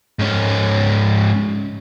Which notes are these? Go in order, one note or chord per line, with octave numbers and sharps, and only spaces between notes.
G#2 C#4